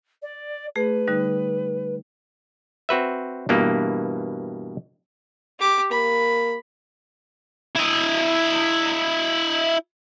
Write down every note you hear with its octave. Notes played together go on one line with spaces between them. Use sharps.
D5
A3 G#4 B4
D3 G3 D#4
C4 F#4 B4 E5
G2 B2 E3 A#3
G4 D6
A#3 B5
E4 D#5